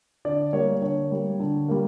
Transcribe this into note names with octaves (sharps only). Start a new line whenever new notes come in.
D3 D5
G3 A#3 C#5
D3 C#5
G3 A#3
D3
G3 A#3